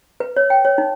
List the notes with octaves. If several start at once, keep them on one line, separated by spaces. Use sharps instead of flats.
B4
C#5
G5
C#5
D#4